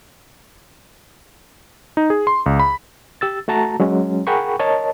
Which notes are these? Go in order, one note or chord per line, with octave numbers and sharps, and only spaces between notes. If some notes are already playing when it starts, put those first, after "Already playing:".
D#4
G#4
C6
C#2
B5
G4 E6 A6
A3 F#4 A5 A#5
F#3 G#3 C#4
G#4 A#4 F#5 G5 B5 C#6
A#4 C#5 D#5 A5